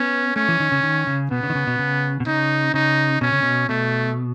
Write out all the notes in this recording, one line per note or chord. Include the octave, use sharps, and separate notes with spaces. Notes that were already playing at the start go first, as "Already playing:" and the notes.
Already playing: B3 C#4
A3 C#4
E3
D#3
C#3
D#3
C#3
B2 B3
C#3
D#3
C#3
B2
C#3
B2
C#3 D#4
C#3 D#4
B2 C#4
C#3
B2
B2 A3